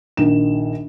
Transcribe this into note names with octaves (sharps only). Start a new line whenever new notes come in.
A#1 D#3 E7